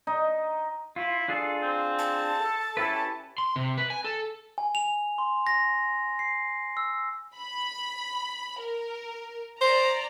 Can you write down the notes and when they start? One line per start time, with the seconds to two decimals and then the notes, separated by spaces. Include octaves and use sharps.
0.07 D#4
0.96 E4 F4
1.28 D4 F4 G#4 A4
1.62 C4
1.99 A5
2.40 A4
2.77 C#4 E4 G4 A4 B4
3.38 C6
3.56 C3
3.78 B4
3.90 G#5
4.05 A4
4.58 G#5
4.75 F7
5.18 C6
5.47 A#6
6.19 C7
6.77 E6
7.36 B5
8.61 A#4
9.61 C5 D5 A#5